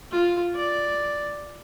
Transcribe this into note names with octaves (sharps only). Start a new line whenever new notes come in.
F4
D5